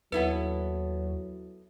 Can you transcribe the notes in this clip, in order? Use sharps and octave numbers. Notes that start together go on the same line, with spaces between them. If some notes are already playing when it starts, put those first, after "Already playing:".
D#2 F#3 B3 E4 A4 B4 F#5